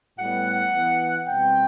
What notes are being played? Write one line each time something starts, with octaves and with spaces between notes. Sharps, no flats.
A2 G3 B3 F#5
E3 B3
B2 G3 C4 G5